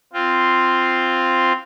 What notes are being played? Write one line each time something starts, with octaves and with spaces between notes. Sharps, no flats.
C4 F4